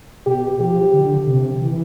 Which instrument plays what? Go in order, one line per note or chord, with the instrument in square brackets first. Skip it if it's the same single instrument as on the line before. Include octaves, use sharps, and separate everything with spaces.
[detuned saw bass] B2 [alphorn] G4
[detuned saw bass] F3 [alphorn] G4
[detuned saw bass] D3
C3
E3